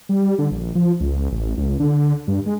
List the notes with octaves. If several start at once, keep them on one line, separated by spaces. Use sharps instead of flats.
G3
D3
A#1
F3
C#2
A1
C#2
D3
G2
G#3